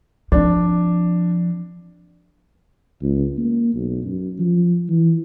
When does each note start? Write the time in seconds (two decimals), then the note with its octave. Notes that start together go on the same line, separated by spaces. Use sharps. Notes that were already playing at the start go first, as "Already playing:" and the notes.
0.32 F3 C4 D4
3.03 C#2
3.38 A#3
3.74 B1
4.05 F#2
4.39 F3
4.89 E3